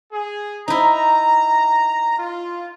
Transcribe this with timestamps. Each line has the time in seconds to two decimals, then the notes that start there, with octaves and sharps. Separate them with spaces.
0.12 G#4
0.68 D#4 E4 A#5
2.18 F4